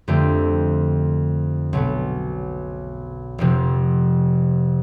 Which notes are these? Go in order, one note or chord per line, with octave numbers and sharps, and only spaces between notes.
F2 D3 A3 C4 G4
B1 B2 B3
F1 F2 C3 F3